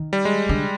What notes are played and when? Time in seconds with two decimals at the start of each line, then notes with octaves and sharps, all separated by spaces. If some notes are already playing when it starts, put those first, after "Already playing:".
Already playing: D#3
0.13 G3
0.25 G#3
0.49 D3